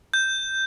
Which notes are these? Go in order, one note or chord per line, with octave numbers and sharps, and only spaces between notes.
G6